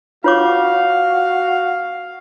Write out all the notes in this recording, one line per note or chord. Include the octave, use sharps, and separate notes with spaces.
F4 F#4 C#5 F5 D6